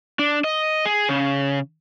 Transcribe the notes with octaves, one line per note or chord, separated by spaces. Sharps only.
D4
D#5
G#4
C#3